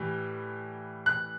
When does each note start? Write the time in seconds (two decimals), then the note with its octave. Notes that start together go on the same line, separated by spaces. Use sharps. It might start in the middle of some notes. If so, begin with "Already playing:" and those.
Already playing: A2 E3 G3
1.06 F#6